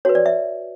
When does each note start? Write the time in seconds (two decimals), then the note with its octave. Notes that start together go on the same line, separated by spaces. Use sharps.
0.05 F#4 B4 C#5
0.15 D5
0.26 E5